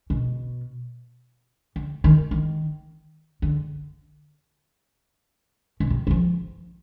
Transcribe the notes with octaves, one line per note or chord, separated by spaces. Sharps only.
B2
D3
D#3
D#3
D3
B2
C3
F#3
F3